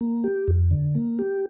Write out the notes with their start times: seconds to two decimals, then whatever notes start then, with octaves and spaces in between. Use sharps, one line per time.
0.01 A#3
0.24 G4
0.48 F2
0.71 D3
0.95 A#3
1.19 G4